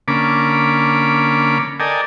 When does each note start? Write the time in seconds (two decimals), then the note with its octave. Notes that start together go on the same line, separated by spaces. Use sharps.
0.08 D3 A#3 C#4 B5 D6
1.80 A4 A#4 D5 D#5 G5 G#5